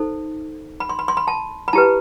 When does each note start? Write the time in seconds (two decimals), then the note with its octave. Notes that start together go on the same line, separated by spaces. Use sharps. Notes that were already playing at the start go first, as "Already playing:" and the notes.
Already playing: D#4 A4 C5
0.80 B5
0.89 C6
0.99 B5
1.08 C6
1.17 B5
1.28 A5
1.68 B5
1.73 E4 G4 B4 A5